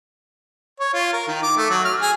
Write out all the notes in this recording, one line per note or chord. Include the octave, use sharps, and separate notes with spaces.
C#5
F4
A#4
D#3
D6
A3
F#3
F6
G#4